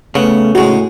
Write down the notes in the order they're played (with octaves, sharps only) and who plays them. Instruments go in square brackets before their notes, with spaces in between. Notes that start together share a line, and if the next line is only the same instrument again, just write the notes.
[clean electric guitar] C#3 [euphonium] A3 [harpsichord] B3
[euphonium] A2 [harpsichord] G#3 D#4 [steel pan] F#4